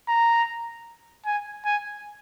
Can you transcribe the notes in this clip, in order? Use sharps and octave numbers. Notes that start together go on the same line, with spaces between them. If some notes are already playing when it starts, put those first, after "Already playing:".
A#5
G#5
G#5